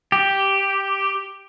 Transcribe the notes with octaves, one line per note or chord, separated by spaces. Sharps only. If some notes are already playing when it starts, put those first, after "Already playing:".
G4